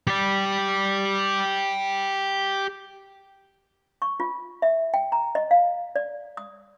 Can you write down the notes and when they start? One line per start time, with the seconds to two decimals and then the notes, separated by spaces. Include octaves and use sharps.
0.07 G4 D5
4.02 C#6
4.20 F4
4.62 E5
4.94 G5
5.12 A#5
5.35 D#5
5.51 F5
5.96 D5
6.37 D#6